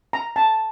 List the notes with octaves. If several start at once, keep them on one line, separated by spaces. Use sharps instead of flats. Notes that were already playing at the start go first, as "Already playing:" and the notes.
A#5
A5